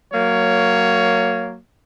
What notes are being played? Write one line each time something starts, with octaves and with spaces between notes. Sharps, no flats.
F#3 A#3 C#5